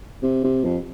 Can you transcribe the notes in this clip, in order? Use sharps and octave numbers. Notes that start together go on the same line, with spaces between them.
C3
C3
F2